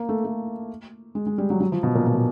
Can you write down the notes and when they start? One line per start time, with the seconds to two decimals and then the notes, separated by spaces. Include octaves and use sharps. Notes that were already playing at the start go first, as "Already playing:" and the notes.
Already playing: A#3
0.09 A3
0.25 A3
1.15 G#3
1.26 G#3
1.38 G3
1.50 F#3
1.60 F#3
1.72 F3
1.83 B2
1.95 A#2
2.07 B2
2.14 A#2